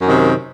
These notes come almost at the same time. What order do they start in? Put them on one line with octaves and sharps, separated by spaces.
F#2 D#3 C3